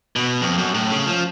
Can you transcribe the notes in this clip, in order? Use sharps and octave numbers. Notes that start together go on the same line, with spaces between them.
B2
F2
F#2
A2
C#3
F3